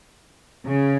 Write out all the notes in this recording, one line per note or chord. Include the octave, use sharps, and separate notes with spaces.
C#3